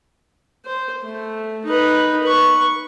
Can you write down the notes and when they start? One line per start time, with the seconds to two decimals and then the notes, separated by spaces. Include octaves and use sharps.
0.65 C5
1.04 A3
1.65 D#4 B4
2.23 B4 C#6